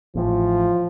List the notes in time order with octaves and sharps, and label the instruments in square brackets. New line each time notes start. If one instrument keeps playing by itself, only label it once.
[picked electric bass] A1 A2 [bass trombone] F3